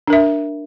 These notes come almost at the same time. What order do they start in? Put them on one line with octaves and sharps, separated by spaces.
D4 A#4 E5